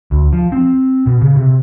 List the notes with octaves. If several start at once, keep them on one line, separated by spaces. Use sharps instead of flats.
D2
F3
C4
B2
C#3
C3